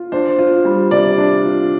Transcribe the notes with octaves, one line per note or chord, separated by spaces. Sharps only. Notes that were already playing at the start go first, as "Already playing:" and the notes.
Already playing: F4
D4 C5
F4
G3
C3 D5
D4
F4